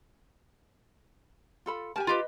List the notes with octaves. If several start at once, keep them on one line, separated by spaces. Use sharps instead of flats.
F4 A4 B5
G4 A#4 G#5 A5
F4 G4 B4 D#5 B5